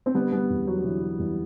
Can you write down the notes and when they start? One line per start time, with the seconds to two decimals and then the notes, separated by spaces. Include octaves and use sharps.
0.06 C4
0.15 D3 G3 B3
0.32 G3 B3
0.50 E2
0.67 F#3
0.78 F#3
0.84 D3 E3
1.01 F#3
1.19 E2 E3 G3